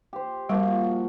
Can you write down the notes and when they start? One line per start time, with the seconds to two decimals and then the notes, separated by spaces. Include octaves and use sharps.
0.13 G4 C5
0.49 F3 G3 A#3 F#4